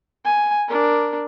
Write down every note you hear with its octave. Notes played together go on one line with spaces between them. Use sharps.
G#5
D4 A#4